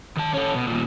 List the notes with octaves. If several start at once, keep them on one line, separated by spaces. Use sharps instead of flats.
D#3 A5
C#4 A4
B2
D#2 A#2